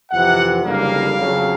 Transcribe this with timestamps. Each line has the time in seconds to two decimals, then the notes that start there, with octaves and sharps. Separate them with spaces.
0.11 F2 C3 E3 F#5
0.64 F#1 F2 D3 G3 A#3 F5
1.18 F2 C#3 F#3